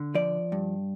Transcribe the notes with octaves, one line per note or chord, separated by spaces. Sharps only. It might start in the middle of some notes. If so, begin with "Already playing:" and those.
Already playing: D3
F3 D5
G2